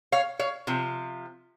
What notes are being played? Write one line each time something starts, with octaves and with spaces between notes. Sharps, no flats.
C#5 F5
C#5 F5
C3 F3